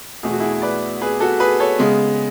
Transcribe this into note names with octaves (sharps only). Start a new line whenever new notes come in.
E2 B2 A3 G#4
F#4
E4 G#4
B4 D5
G#4 B4
F#4 A4
G#4 B4
A4 C#5
C#3 G#3 B3